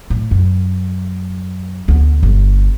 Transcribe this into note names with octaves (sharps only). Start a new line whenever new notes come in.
A2
F#2
D2 B3
G1